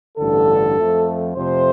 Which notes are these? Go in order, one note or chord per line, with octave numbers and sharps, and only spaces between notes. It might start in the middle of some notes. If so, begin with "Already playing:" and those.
A1 G2 D3 A4
F2 F3 A3
F2 C3 A3 C5